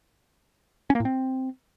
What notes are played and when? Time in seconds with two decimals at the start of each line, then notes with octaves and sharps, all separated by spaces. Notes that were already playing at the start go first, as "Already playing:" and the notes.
0.90 C#4
0.95 A#3
1.00 A2
1.05 C4